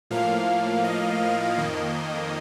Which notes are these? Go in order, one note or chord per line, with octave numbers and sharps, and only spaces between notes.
A2 F3 A#3 F5
D#5
F2 D#3 A#3